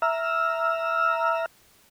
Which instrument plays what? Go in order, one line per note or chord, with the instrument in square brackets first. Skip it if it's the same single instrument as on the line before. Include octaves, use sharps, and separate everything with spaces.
[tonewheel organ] E5 A#5 E6 F6